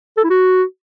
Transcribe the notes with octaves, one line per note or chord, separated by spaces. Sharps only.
A4
E4
F#4